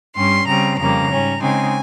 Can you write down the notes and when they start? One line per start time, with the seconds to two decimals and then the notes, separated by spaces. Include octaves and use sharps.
0.16 G2 G3 C#4 C6
0.47 C#3 G3 C4 A#5
0.79 F2 C#3 G3 A#3 A#5
1.11 G#2 G3 C#4
1.41 C#3 G#3 C4 D#4 G#5